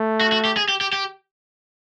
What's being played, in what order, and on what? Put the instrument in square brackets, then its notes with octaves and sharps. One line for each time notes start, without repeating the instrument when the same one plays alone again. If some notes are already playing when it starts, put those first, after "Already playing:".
Already playing: [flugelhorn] A3
[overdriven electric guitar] F#4
F#4
G4
G#4
G4
G4
G4